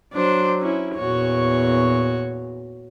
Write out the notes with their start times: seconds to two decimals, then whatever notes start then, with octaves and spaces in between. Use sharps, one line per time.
0.13 F#3 D4 C5
0.61 C#4 E4
0.95 E2 A#2 F#4 C#5